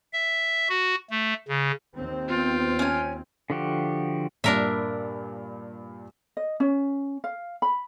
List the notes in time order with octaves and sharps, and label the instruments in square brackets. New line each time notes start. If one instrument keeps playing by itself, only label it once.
[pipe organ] E5
F#4
A3
C#3
[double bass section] D#2 C4
[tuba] B3 [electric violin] F4 G5
[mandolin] C#4 G#5
[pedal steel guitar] D3 F3 F#4 G4
[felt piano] G2 A#2 [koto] D4 A#4 E5
[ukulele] D#5
C#4
F5
B5